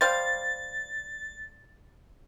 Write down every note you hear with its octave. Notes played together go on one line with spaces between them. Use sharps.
G3 C5 F5 A6